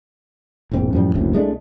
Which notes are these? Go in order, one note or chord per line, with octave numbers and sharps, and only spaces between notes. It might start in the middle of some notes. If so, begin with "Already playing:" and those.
E1 A#1 G#2 C4
F#2 A2 F3 G3
F#1 D2 A2
C2 G#3 A3 D4